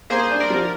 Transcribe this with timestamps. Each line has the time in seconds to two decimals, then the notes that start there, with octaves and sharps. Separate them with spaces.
0.10 A#3 G#4 C5
0.30 D4
0.40 A#4 D5
0.50 F3